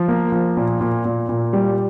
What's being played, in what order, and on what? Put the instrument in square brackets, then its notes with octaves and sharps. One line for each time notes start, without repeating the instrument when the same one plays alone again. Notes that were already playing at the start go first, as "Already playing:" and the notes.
Already playing: [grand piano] F3
A#3
F3
A#2
A#2
A#2
A#2
G3